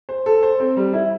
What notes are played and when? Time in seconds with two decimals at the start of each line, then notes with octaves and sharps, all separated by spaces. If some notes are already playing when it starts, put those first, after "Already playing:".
0.09 C5
0.26 A4
0.43 C5
0.60 C4
0.77 G3
0.93 E4